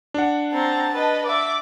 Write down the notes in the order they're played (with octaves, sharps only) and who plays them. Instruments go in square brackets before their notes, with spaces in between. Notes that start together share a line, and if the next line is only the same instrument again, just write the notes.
[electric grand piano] D4 F#5
[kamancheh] C4 A#5 [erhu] A5
[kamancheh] B4 D#5
[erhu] D5 [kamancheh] E5 D6